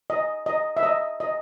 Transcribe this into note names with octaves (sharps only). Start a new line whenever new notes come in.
D#5
D#5
E5
D#5
D#5